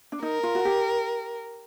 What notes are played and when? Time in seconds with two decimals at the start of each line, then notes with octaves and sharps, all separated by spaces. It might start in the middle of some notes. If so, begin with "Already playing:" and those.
0.12 D4
0.23 D#4 A#4
0.43 F4
0.55 F#4
0.65 G4